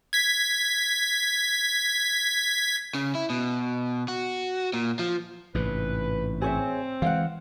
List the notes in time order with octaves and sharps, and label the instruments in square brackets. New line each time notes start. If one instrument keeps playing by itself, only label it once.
[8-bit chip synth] G#6 B6
[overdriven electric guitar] C#3
E4
B2
F#4
A#2
F3
[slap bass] A1 G#2 C3 [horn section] B4
[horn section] C4 [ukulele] G#4 C#5 E5
[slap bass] E3 F#3 G#3 [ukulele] F5 F#5